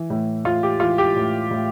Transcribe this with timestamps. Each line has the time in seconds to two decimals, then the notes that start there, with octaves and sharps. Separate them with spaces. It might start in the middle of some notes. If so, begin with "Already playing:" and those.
Already playing: E3
0.10 A2
0.45 A2 F4
0.63 G4
0.80 E3 F4
0.98 G4
1.16 A2
1.51 A2